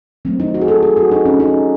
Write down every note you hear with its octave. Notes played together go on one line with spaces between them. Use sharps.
D#3 F#3 A3 C4
D#4
F#4
G#4
A4
G#4
F#4
D#4
C#4
D#4